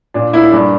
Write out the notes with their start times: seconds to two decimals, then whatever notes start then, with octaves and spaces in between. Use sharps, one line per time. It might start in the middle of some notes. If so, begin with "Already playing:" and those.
0.14 A#2 D4
0.33 A#3 E4
0.52 G2 D4